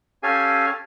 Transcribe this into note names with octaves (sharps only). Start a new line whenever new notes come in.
C#4 G4 A4 F5 G#5